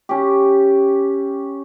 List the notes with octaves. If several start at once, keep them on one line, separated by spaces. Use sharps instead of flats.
C#4 G4